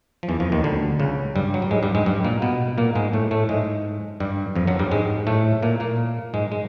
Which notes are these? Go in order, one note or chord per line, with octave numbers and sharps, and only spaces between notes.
F3
E2 E3
F2 F3
D#2 D#3
D2 D3
C#2 C#3
G2 G3
F#3
G3
G#2 G#3
G2 G3
G#2 G#3
G2 G3
A#2 A#3
B2 B3
A#2 A#3
G#2 G#3
A2 A3
A2 A3
G#2 G#3
G2 G3
F2 F3
F#2 F#3
G2 G3
G#2 G#3
A2 A3
A#2 A#3
A#2 A#3
G#2 G#3
G#3